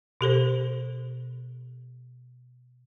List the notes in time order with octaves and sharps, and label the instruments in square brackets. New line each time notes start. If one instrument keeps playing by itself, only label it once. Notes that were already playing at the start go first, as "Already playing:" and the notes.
[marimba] B2 G4 A4 C5